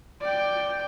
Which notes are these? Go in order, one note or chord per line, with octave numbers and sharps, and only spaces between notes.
D5 G5